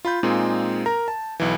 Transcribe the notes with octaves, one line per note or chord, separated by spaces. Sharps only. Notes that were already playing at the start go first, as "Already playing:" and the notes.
F4 B5 G6
A#2 G#3 C4 D#4 F4 G#4
A#4 A#5
A5
B1 E3